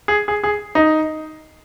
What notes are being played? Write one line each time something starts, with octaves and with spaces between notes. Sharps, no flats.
G#4
G#4
G#4
D#4